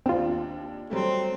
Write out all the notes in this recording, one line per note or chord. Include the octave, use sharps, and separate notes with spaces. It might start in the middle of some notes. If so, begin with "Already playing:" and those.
D#2 C4 D4 F4
F#3 G3 A3 C4